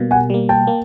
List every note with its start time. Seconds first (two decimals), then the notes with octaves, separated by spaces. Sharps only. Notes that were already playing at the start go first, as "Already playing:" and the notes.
Already playing: B2 G3 A#3
0.11 F#5 G#5
0.30 G3 A#3
0.49 G5 A5
0.67 A#3